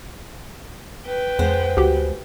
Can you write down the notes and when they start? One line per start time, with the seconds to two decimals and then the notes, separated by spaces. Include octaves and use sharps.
1.06 B4 G5
1.39 F2 G#3 B3 C5
1.77 D2 F#4 G4